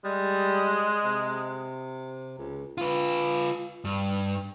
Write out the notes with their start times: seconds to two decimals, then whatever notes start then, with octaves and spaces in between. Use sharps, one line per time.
0.05 G3 G#3
1.04 C3
2.38 C#2
2.78 F4 B4
3.85 G2